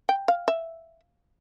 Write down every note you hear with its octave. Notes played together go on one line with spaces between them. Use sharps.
G5
F5
E5